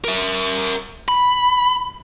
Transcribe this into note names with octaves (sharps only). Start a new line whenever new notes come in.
A#4 E5
B5